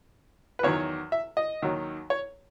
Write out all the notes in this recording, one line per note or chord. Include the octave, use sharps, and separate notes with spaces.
B4
E2 D#3 F#3 C#5
E5
D#5
D#2 D#3 F#3
C#5